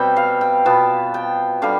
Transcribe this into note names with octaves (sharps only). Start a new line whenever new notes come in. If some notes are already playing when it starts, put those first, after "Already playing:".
Already playing: B2 G3 C4 G5
F5
G5
B2 B3 F4 A5
G5
D3 G3 F5